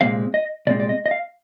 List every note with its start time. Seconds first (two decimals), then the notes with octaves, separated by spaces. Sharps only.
0.01 C2 A#2 G#3 C4 F5
0.34 D#5
0.67 C2 A#2 G#3 C4 D5
0.80 D5
0.89 D#5
1.06 D#5
1.11 F5